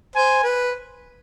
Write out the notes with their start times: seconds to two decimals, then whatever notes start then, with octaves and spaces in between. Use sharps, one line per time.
0.16 C5 G#5
0.44 B4